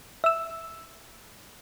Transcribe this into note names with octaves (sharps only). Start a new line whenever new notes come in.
E5 E6